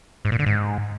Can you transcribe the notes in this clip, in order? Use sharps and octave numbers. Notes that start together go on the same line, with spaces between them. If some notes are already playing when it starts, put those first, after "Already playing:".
G#2
A#2
D3
G#2